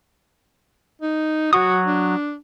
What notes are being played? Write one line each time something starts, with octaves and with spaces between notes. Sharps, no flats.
D#4
F#3 F#4 C#6 D#6
D4